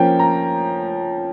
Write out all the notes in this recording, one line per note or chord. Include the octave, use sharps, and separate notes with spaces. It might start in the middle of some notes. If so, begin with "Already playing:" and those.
Already playing: F3 A#3 C#4 G5
A#5